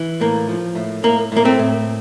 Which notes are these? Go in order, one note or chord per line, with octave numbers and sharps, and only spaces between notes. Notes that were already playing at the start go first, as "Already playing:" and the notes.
Already playing: E3
A2 A#3
F3
A2
A2 A#3
A2 A#3
A3 C4
A2